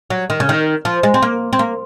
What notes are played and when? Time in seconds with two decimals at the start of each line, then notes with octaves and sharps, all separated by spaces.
0.10 F#3
0.30 D#3
0.40 C#3
0.49 D#3
0.85 F3
1.03 G#3
1.14 C4
1.22 A#3
1.53 C4
1.59 A#3